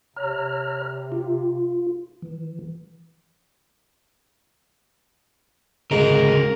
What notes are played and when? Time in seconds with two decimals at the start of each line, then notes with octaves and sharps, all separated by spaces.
0.16 C3 C#5 A#5 F6
1.12 F4
2.22 E3
5.91 D2 G#2 C#3 G#3 A#4